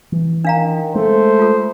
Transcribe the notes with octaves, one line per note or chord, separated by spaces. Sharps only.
E3
D#3 D4 F5 A#5
G#3 A3 C5
F4 A4